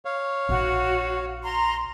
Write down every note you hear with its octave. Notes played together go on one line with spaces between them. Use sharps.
C#5 F5
A#1 D#4 F#4
A#5 C6